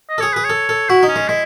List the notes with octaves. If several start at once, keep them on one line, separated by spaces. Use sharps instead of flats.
D#5
G#4 A4 C#5
G#4 B4
A4 C#5
A4
E4 F#4
D#4
C#4
G#3
G#3 E4